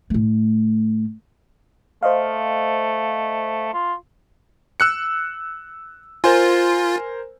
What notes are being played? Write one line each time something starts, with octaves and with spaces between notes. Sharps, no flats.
A2 A3
A3 C5 D#5 F5
F4
E6 F#6 C#7
F4 A#4 C5 G#5